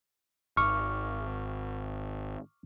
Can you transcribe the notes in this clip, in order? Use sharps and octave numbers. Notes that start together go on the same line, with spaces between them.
G#1 C#6 D6 F6